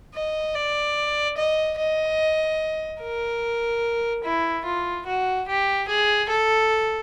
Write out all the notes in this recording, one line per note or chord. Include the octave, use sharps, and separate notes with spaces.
D#5
D5
D#5
D#5
A#4
E4
F4
F#4
G4
G#4
A4